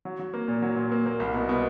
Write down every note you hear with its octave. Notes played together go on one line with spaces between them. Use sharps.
F#3
F#3
A#3
A#2
F#3
A#2
A#3
A#3
C2
B2
B2